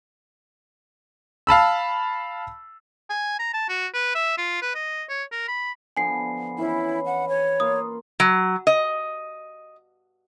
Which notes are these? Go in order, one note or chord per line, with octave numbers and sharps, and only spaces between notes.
F5 A5 B5 E6
G#5
A#5
A5
F#4
B4
E5
F4
B4
D#5
C#5
A#4
B5
D3 F3 B3 G#5 C7
E3 C#4 E4
F#5
C#5
A#3 F4 D#6
F#3
D#5